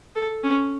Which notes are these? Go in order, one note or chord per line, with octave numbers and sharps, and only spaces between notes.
A4
C#4